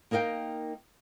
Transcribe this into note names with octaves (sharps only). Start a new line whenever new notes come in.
A#3 D#4 A#4 F5 G5